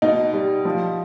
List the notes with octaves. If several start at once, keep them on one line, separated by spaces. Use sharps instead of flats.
B2 D#4
G3
F3